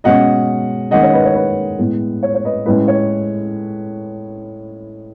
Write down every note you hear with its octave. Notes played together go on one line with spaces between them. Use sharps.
B2 G#3 C#4 D#5 F#5
D#3 G#3 C#4 D#5 F#5
C#5
B4 D#5
C#5
B4
A2 G#3 B3
C#5
C#5
B4 D#5
A2 G#3 C#4 B4
C#5